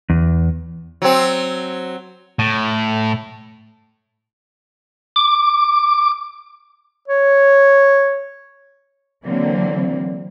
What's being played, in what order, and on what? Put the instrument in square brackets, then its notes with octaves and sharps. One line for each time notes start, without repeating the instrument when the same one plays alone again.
[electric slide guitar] E2
[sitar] F#3 C4
[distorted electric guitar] A2
[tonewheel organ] D6
[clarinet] C#5
[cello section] D3 E3 F#3 A#3 C4